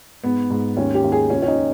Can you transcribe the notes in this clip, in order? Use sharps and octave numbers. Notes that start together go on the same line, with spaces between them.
G#2 B3
G#2
D#2 C#4
G4
D#2
G#4
C#2 C#4
C#4
D#4